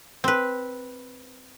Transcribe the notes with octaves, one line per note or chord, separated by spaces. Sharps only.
C4 B4